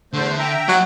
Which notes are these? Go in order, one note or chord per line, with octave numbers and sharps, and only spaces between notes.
E2 D3 A3 C5
E5 G5 A#5
F#3 G4 D#5